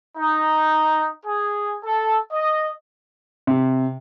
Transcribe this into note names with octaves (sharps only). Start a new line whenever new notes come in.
D#4
G#4
A4
D#5
C3